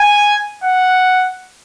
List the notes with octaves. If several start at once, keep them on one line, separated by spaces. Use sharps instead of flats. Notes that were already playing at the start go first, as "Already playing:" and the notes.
Already playing: G#5
F#5